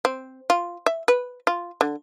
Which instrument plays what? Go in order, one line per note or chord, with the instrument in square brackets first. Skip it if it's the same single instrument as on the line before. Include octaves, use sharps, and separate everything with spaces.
[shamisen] C4
F4
E5
B4
F4
D3